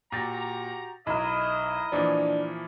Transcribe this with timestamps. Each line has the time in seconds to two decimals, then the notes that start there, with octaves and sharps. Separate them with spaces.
0.12 A#2 F#4 G4 A#5 A6 A#6
1.07 B1 D#4 E4 A#4 D#5
1.92 A#2 E3 F3 D4